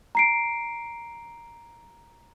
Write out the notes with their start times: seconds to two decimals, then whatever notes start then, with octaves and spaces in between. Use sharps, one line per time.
0.15 A#5 C7 D7